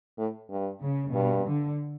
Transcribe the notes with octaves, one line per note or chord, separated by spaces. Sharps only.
A2
G2
C#3
G2 B2
D3